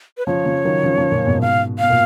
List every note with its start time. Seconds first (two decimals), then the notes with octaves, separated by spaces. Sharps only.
0.18 B4
0.26 C#3 F3 C#5
0.45 C#3 F3
0.64 D#3 F#3
0.83 C#3 F3
0.98 C#3 F3
1.12 A#2 C#3
1.26 G#2 B2
1.41 F5
1.79 B2 F5
1.90 A#2